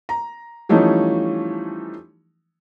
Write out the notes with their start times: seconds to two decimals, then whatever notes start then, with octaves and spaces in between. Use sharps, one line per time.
0.09 A#5
0.69 E3 F3 G3 A3 C#4 D#4